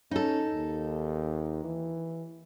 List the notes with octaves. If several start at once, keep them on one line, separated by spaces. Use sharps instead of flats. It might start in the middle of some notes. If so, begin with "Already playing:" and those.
C#4 D#4 A4
D#2
E3